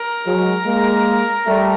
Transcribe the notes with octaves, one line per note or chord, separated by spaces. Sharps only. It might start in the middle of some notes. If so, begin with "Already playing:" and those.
Already playing: A#4
F#3 G#3
G#3 A#3
G3 A3